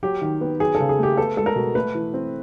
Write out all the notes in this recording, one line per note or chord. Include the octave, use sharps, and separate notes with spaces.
F#3 G4
D#3
B3
F#3 G#4
A4
C#3
G#4
A3 G4
B3 A4
G#3 A4
A#4
B2
A3 B4
E3
C4